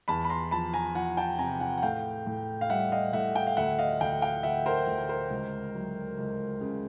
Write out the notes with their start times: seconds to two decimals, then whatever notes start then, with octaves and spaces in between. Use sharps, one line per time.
0.08 E2 A5 B5
0.25 B5
0.30 A#5 C6
0.51 F3 A5 B5
0.74 G#5 A#5
0.95 F3 F#5 G#5
1.17 G5 A5
1.39 C3 G#5 A#5
1.60 F#5 G#5
1.78 F#5
1.82 A2 F5 G5
2.27 A2
2.61 F5
2.70 G3 E5 F#5
2.92 D#5 F5
3.13 A2 E5 F#5
3.34 F5 G5
3.47 F5
3.57 D2 E5 F#5
3.79 D#5 F5
4.00 D2 F5 G5
4.22 F5 G5
4.43 D2 E5 F#5
4.66 A#4 C5
4.87 D2
5.09 A#4 C5
5.30 C#2
5.75 F#3
6.18 C#2
6.61 C#3